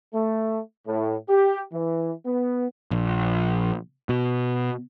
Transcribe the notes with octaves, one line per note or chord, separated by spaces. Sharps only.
A3
A2
G4
E3
B3
A#1
B2